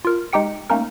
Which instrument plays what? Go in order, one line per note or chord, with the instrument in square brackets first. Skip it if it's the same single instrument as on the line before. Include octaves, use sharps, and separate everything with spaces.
[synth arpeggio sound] F4 A#4
G#3 D#4 G4 G5 C#7
A3 A#3 C#4 D#4 A#4